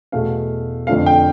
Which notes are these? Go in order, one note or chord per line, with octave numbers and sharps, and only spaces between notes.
E2 B2 A3 F5
F2 D3 F3 A3 F5
G5